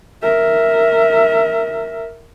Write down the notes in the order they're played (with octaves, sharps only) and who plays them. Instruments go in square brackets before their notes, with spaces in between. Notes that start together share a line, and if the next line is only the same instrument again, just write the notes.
[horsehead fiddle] A#4 E5